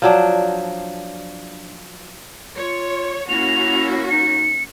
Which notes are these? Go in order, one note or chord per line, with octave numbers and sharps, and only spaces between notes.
F3 F#3 D4
F4 C#5
A#3 C#4 E4 F#4 F7
D#4 C#7